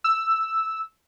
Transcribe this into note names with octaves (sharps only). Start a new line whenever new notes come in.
E6